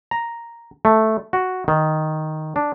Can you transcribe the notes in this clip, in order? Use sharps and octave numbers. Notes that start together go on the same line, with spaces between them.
A#5
A3
F#4
D#3
D4